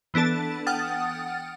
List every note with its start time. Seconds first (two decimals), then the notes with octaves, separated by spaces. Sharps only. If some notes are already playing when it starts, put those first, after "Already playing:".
0.14 E3 B3 D4 A4 A5
0.67 F#5 G5 D#6 F6 A6